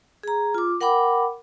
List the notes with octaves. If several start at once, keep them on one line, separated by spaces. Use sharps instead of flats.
G#4 A#5
F4 D6
A#4 F#5 G5 B5 D6